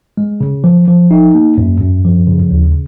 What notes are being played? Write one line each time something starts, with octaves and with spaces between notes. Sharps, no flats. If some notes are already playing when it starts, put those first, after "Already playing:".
G#3
C#3
F3
F3
D#4
A#3
F#2
F#2
F3
C#3
D#2